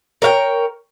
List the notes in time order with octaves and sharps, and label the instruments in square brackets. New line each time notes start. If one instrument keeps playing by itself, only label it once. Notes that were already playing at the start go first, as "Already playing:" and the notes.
[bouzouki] A#4 C#5 F5 G5